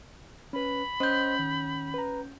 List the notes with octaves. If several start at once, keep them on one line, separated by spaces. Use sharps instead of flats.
C#4 B4 B5
C#4 C5 D#5 C6 G6
D#3
B4 A#5